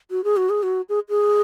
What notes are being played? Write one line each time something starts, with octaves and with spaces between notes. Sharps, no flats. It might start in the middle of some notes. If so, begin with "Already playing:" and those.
F#4
G#4
F#4
G#4
F#4
G#4
G#4